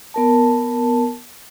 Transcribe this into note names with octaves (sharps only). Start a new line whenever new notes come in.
B3 A#4 A5